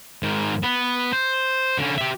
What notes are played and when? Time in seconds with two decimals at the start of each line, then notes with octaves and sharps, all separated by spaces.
0.23 G#2 D#3
0.63 B3
1.13 C5
1.78 D3 C#4
1.98 G4 E5